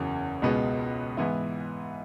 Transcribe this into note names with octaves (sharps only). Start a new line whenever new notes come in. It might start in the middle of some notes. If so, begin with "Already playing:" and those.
Already playing: F#1 E2 C#3 F#3
C#2 B2 G#3 B3
G#2 E3 B3 E4